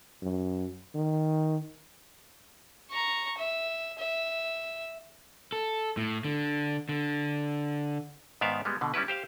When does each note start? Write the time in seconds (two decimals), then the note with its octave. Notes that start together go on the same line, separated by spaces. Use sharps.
0.22 F#2
0.95 D#3
2.90 A#5 C#6
3.38 E5
3.98 E5
5.52 A4
5.97 A2
6.25 D3
6.89 D3
8.41 G#2 D#3 B3 D5 E5 F5
8.65 G3 G#3 B3
8.81 B2 D3
8.94 G3 C#4 E4 B4
9.08 G4 C5 F5